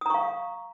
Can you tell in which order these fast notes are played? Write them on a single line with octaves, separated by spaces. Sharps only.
D#6 A#5 C#6 F5